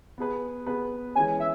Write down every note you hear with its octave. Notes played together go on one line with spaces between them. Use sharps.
B3 G#4 B4
B3 G#4 B4
E3 G#3 C#4 G#5
E5